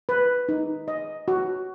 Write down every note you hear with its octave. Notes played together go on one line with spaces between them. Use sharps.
B4
D#4
D#5
F#4